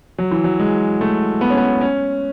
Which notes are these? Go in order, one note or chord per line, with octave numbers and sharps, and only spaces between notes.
F#3
E3
F#3
G#3
A3
B3
C#4
B3
C#4